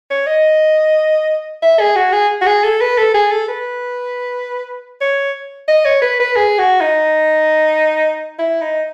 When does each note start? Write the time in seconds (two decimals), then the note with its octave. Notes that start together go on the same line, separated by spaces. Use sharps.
0.10 C#5
0.27 D#5
1.62 E5
1.80 G#4
1.96 F#4
2.13 G#4
2.41 F#4
2.46 G#4
2.64 A4
2.81 B4
2.98 A4
3.14 G#4
3.31 A4
3.48 B4
5.01 C#5
5.68 D#5
5.85 C#5
6.02 B4
6.19 B4
6.36 G#4
6.59 F#4
6.81 D#4
8.39 E4
8.61 D#4